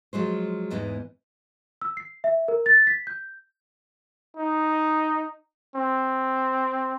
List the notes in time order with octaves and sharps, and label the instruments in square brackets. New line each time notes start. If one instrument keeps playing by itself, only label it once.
[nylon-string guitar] F3 F#3 G#3 C5
E2 G#2 E3 B3 D#4 E4
[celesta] E6
C7
E5
A#4
A6
B6
G6
[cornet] D#4
C4